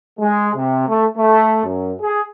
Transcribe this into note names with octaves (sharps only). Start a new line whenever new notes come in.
G#3
C3
A3
A3
F#2
G#4